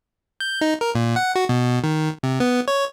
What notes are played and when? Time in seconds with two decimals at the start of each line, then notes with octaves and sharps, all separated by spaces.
0.40 G6
0.61 D#4
0.81 A#4
0.95 A#2
1.16 F#5
1.35 F#4
1.49 B2
1.84 D#3
2.23 C3
2.40 B3
2.68 C#5